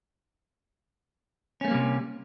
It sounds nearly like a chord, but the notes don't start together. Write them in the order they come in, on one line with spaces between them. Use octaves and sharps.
C#4 A3 A#3 G3 C3